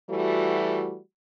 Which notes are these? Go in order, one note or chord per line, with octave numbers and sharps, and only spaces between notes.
E3 G3 A3 F#4